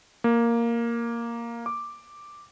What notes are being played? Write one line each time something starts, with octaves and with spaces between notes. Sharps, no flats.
A#3
D6